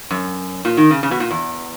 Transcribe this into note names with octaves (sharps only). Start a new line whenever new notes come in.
F#2
A#2
D#3
C#3
C#3
B2
A#2
E2